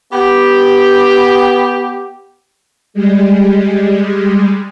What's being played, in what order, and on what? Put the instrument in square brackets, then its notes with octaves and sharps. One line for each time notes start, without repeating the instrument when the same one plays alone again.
[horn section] B3 G4
[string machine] G3 G#3